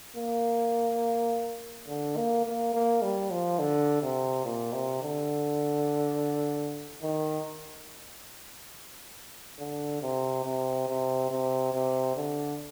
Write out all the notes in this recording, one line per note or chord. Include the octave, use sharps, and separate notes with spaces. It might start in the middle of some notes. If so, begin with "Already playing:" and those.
A#3
D3
A#3
A#3
A#3
G3
F3
D3
C3
A#2
C3
D3
D#3
D3
C3
C3
C3
C3
C3
D3